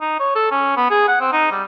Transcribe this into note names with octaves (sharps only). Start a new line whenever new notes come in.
D#4
C#5
A4
C#4
B3
G#4
F#5
C4
D#4
G3